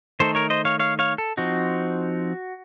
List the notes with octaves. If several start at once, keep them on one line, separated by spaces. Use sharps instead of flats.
D#3 A3 D#4 A4 C5
A#4 C#5
C5 D#5
C#5 F5
C#5 F5
C#5 F5
A4
F3 C4 D#4 F#4